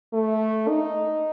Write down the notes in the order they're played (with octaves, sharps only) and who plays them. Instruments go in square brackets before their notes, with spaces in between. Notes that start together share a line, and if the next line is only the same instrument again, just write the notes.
[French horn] A3
D#4